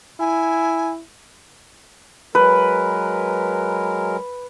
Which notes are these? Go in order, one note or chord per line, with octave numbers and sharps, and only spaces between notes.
E4 G#5
F#3 G#3 A#4 B4